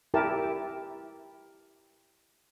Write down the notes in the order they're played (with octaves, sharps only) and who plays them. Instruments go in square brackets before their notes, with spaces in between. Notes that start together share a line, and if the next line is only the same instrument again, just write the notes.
[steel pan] E4 G4 A#4 A5